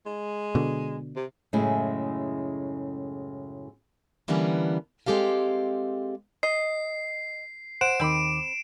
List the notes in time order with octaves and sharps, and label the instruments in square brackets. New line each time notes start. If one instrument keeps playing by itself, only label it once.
[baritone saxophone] G#3
[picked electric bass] B2 D3
[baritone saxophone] C3
[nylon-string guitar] F#2 A2 C#3 G#3 A3 E4
[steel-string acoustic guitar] D3 E3 G3 A#3 B3 C#4
G#3 C4 G4 A4 F5
[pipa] D#5 [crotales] C7
[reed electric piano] C5 F#5 [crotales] D7 E7
[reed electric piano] D#2 D#3 D6 [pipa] C4 B5